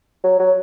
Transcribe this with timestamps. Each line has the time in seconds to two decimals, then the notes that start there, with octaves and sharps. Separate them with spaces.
0.24 F#3
0.39 F#3